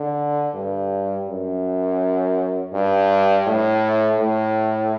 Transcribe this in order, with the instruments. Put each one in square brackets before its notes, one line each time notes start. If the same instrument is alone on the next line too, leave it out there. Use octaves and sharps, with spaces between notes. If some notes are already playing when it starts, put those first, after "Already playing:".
Already playing: [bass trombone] D3
G2
F#2
G2
A2
A2